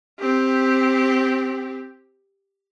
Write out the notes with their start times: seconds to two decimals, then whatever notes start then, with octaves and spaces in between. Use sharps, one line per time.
0.19 C4 G4